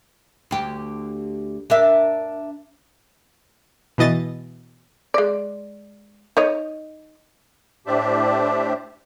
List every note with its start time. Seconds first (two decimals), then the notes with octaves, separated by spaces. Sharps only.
0.51 D2 G4
1.70 D4 A#4 E5
3.98 B2 E3 D#5 A6
5.14 G#3 D5
6.37 D#4 C#5 D#5
7.87 A2 D4 G4 C5 D5 E5